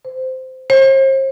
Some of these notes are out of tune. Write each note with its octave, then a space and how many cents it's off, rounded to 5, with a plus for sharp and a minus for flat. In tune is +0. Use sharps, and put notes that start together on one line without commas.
C5 -15
C5 +40